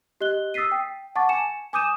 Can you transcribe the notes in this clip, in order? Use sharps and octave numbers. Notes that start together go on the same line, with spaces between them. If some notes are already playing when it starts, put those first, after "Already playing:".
G4 D#5 F#6 G7
D#6 E6 A6 B6 C7 D#7
G5
F#5 A5 C#6 D6 A6
G#5 C#7 E7
G#5 D6 D#6 G6 D#7 E7